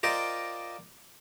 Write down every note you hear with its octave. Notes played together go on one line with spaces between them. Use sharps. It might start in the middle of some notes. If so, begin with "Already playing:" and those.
F4 A#4 C5 D5 D#5 G5